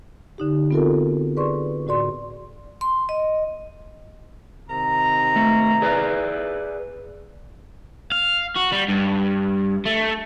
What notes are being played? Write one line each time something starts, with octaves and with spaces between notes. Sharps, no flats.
D3 D#4 G4
B3 C4 F4 F#4 A4 A#4
G#4 B4 D5 C6 C#6
A2 F#4 D5 C6
C6
D#5
C3 D#3 A#5
A3
G#4 B4 D5
F5
F#4
G3
G2
A3